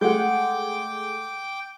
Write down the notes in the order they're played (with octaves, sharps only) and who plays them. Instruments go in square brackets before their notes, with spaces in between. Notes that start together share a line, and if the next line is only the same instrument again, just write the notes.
[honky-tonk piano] G#3 A3 G#4 [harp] F#5 G6 [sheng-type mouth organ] G5 D6